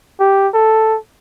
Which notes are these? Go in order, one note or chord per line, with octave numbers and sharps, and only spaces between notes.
G4
A4